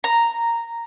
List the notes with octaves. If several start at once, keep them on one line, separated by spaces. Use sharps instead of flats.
A#5